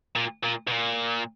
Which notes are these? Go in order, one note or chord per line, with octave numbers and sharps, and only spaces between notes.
A#2
A#2
B2
A#2